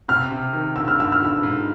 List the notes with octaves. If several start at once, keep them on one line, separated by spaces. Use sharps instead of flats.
C3 F6
C3
D#3
G2 E6
F6
G2 E6
F6
D3 E6
G#2